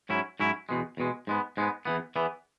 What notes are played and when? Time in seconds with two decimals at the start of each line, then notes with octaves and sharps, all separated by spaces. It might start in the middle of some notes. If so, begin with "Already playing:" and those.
0.09 G#2 F#3 C#4 E4
0.40 G#2 F#3 C#4 E4
0.69 E2 B2 G#3
0.97 E2 B2 G#3
1.27 G#2 G#3 B3
1.57 G#2 G#3 B3
1.85 E2 E3 B3
2.16 E2 E3 B3